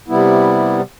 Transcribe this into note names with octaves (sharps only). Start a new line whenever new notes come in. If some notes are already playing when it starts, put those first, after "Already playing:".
C3 G3 B3 E4